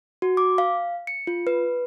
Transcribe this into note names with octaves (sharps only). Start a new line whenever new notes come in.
F#4
D6
F5
C#7
F4
B4